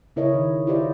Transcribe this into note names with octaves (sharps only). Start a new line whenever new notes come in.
C#3 E4 A#4 C#5 D#5
D#3
E4 F4 G4 C5 D5 D#5